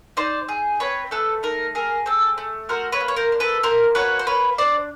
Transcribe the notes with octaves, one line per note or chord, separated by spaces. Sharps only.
D#4 C5 D5
G#4
C4 B4 C#5
A3 A4 B4
D#4 A#4
G#4 A#4
C4 A4
A3
F#4 A#4 C5
B4 C#5
A#3
C#5
A#4 C5
D4
A4 B4
A#3 A#4 C5
F#4 B4 C#5
C5
A#3 B4 C#5
D4 C5 D5